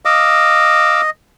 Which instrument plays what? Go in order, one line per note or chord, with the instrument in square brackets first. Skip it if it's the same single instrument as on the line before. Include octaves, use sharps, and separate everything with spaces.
[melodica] D#5 [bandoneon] F5 D6 E6